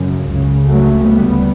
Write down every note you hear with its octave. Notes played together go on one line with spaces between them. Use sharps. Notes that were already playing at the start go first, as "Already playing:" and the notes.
Already playing: F#2 C#3
C#2 C#3
F#3 A3
D2 C#3 G3 B3